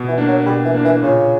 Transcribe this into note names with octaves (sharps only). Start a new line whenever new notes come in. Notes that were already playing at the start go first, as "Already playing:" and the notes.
Already playing: B2
E3
A#3 D4
F#3
B2 G3
E3
A#3 D4
E3
A#2 C#3